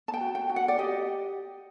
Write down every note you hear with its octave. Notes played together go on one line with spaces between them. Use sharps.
A5
G5
F#4
G5
F#4
F#5
D5
G4 D#5